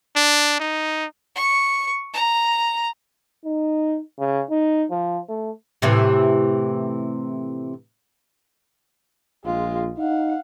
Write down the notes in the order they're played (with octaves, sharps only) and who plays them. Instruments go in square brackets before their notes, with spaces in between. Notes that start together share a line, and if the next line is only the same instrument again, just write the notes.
[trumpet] D4
D#4
[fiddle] C#6
A#5
[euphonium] D#4
C#3
D#4
F3
A3
[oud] A2 C3 E3
[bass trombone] A#1 [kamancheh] G#3 F4
[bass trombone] D#4 [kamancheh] F5 F#5